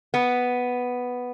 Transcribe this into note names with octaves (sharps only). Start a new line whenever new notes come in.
B3